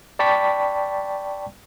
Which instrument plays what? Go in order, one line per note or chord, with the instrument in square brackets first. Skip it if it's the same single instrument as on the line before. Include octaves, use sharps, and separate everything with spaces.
[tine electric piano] D5 G5 A5 B5 C#6 B6